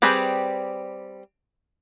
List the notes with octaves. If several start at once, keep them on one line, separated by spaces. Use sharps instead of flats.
G3 C4 G4 G#4 B4